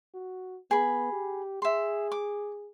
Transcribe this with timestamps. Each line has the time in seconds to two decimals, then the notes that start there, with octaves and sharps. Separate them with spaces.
0.14 F#4
0.71 B3 G#4 B5
1.12 G4
1.62 G#4 E5 C6
2.12 D6